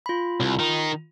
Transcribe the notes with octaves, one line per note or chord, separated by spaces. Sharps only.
F4 B5
C2
D#3 D#4